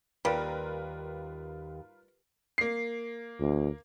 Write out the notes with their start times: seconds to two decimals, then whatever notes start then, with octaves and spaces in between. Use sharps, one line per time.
0.25 D#2 G3 F4 A#4 B4
2.58 A#3 C7
3.40 D2